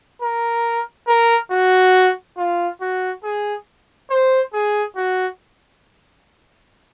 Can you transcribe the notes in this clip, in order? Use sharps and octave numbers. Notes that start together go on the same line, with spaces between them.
A#4
A#4
F#4
F4
F#4
G#4
C5
G#4
F#4